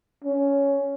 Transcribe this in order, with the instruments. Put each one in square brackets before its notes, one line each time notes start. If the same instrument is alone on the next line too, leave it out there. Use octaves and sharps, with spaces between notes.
[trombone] C#4